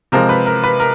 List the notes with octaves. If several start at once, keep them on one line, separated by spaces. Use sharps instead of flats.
C3 F3 G#3 A#4 C5
B4
A#4
B4
A#4